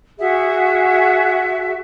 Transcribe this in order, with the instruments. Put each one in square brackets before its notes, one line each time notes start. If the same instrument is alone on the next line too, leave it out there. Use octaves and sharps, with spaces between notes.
[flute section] F#4 G#4 E5 F#5